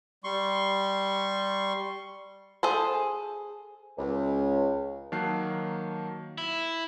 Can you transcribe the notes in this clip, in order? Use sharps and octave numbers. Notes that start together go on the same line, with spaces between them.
G3 C6 C#6
G#4 A4 C5
C#2
D#3 F#3 A#3 A5 F#6 C7
E4